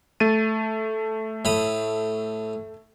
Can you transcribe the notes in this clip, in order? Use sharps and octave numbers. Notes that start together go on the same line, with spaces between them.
A3 A6 D#7
A2 B5 D#6